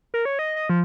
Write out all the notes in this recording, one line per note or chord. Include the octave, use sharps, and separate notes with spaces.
A#4
C#5
D#5
D#5
F3